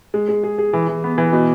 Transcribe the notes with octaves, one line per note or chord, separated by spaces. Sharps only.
G#3
G#3
G#4
G#4
E3
E3
B3
E3
B2